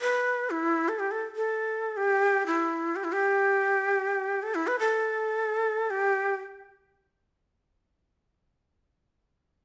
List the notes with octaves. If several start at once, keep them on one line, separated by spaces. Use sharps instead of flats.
B4
E4
A4
G4
A4
A4
G4
E4
G4
E4
G4
A4
E4
B4
A4
G4